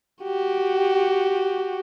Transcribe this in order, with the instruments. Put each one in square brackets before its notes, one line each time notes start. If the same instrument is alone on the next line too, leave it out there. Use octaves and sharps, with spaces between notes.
[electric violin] F#4 G4